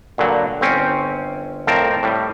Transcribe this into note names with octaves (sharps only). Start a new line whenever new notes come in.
G2 A#2 D3 F#3
G1 C4 C#4
F2 A2 C4 A#4 A5
A2 G3